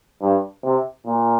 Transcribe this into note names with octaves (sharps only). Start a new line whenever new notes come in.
G2
C3
A#2